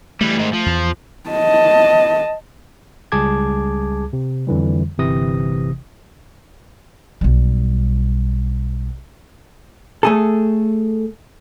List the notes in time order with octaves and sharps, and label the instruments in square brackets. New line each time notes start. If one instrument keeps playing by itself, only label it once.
[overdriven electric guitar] E3 G3 [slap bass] A3
[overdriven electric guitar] G#2 D#3
F3
[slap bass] E2
[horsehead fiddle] D#5 A5
[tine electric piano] C#2 G3 G#4 A5 D6 G#6
C3
F2 D3 E3 G3
G1 C3 E3 D#6 A#6
[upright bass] B1 G3
[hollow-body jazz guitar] A3 G#4 A4